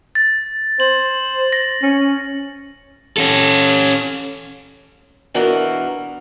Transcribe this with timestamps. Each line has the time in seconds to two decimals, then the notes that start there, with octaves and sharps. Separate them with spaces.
0.15 A6
0.80 C5 F#7
1.53 A#6
1.82 C#4
3.17 C#4 A4
5.34 B2 E3 D4 F#4 A#4 F#7